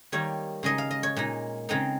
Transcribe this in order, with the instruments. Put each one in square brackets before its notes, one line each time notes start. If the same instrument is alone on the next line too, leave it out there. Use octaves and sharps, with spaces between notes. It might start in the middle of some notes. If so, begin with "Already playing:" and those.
[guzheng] D#3 G3 A#3 D#4 C#5
C#3 G#3 D#4 D#5
F5
D#5
C#5
A#2 G#3 D#4
C#3 G#3 C4 D#4